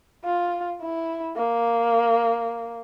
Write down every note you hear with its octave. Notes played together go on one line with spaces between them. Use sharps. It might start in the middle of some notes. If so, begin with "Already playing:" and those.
F4
E4
A#3